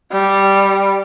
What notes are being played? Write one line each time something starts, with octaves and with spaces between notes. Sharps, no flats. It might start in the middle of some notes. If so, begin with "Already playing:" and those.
G3